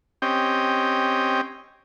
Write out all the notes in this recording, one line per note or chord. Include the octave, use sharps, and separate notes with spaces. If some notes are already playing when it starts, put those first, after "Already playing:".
C4 C#4 G4 D#5 G5